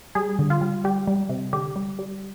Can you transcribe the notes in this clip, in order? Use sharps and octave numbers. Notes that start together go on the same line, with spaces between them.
G3 G#4
D3
F4
G3
G3 G4
G3
C3
D3 G4
G3
G3